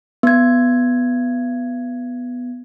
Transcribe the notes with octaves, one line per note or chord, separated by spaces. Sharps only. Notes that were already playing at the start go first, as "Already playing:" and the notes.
B3 G#6